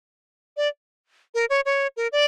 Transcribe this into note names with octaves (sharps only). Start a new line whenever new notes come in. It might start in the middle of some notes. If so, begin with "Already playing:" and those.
D5
A#4
C#5
C#5
A#4
D5